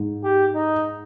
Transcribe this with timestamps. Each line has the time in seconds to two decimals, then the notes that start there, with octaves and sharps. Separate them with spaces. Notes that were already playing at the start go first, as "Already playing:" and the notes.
Already playing: G#2
0.24 G4
0.55 D#4